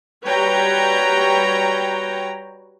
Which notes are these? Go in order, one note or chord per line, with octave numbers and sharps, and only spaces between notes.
G3 F#4 B4 C#5 G5 A#5